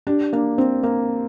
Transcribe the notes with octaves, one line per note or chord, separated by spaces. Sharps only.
D4 G4
A#3 D4
C4
A#3